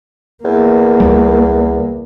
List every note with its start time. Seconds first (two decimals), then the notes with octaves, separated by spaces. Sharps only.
0.44 E2 A#3
1.00 C#2 G3